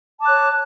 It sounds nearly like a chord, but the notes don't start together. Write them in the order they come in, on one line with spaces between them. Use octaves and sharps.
A5 D6 F#6 C#5